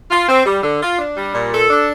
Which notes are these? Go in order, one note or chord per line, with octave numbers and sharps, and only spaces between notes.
F4
C4
G3
D3
F4
D4
G3
A#2
A4
D4